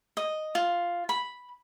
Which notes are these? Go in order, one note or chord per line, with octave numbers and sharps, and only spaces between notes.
D#5
F4
B5